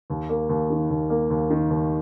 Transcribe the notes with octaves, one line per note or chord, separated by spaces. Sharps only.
D#2
A#3
D#2
D#3
D#2
A#3
D#2
D#3
D#2